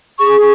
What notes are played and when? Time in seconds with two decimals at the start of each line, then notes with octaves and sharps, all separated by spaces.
0.19 G#4 C#6